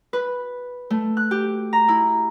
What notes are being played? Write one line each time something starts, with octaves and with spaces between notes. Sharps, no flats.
B4
A3
F#6
G4
A#5
E4